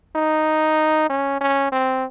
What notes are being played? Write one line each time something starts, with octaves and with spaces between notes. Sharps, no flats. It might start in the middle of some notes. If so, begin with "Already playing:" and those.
D#4
C#4
C#4
C4